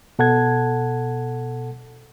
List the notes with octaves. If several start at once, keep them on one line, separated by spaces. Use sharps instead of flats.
B2 A4 F#5 A5 G#6